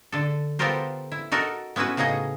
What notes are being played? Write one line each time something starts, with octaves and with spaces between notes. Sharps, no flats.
D3 A4
B3 F4 G4 A4 A#4 C5
E4
D#4 F#4 A4 A#4
B3 C#4 E4 F#4 B4
A2 C#3 D#4 G#4 D#5